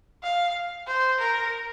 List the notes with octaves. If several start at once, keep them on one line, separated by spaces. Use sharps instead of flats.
F5
C5
A#4